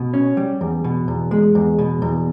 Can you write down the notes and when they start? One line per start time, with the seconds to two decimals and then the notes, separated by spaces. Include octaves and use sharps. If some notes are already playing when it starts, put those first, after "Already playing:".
Already playing: B2
0.14 C#4
0.37 G3
0.61 E2
0.84 B2
1.08 E2
1.31 G#3
1.55 E2
1.79 B2
2.02 E2